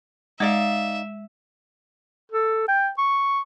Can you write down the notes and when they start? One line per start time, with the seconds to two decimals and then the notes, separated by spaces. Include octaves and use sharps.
0.40 G#3 D#4 D5 E5 F5
2.32 A4
2.68 G5
2.98 C#6